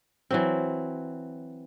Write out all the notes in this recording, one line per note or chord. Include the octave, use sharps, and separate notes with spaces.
E3 F#3 C4